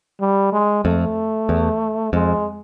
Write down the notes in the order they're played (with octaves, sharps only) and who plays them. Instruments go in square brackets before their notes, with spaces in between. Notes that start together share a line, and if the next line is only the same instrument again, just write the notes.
[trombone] G3
G#3
[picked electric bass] F2 [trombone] A3
[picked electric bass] E2
[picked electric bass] F2 [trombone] G#3